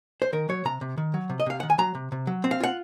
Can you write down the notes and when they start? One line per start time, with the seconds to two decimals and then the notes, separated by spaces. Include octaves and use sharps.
0.22 C5
0.33 D#3 A#4
0.49 F#3 C#5
0.65 C3 A#5
0.81 C3
0.98 D#3
1.14 F#3
1.30 C3
1.40 D#5
1.46 C3 F5
1.60 D#3 F#5
1.70 G#5
1.78 F#3 A#5
1.95 C3
2.12 C3
2.27 F#3
2.44 C4
2.51 F5
2.60 F4 F#5